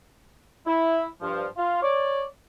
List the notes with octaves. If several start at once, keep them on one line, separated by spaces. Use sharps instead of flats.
E4
G2 F3
F4
C#5 D5